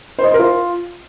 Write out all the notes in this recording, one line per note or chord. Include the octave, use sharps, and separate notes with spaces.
C5
D#5
C5
A#4
F4